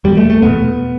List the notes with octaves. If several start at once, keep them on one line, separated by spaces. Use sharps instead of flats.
E2 B2 G3
A3
A3
E2 B2 B3